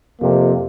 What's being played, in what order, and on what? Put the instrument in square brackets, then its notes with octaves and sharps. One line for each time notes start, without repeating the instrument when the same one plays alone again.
[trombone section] F2 C3 A#3